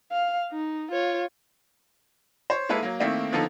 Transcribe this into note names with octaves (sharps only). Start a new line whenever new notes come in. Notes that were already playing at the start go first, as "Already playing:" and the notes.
F5
D#4
F4 C#5
C5 C#5
G#3 A#3 E4 A4 B4
F#3 A#3
D#3 A3 A#3 C4 E4
D3 F3 A#3 B3 D#4 A4